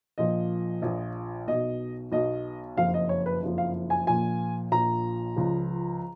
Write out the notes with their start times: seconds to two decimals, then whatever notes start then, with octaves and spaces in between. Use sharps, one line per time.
0.18 A#1 A#2 F3 D#5
0.82 A#1 A#2 F3
1.47 B1 B2 D#5
2.12 B1 B2 D#5
2.77 F#1 F2 F3 F5
2.94 D#5
3.09 C#5
3.26 B4
3.43 F#1 F2 F3
3.58 F5
3.90 G#5
4.07 A#1 A#2 F3 G#5
4.71 A#1 A#2 F3 A#5
5.37 C#2 C#3 F3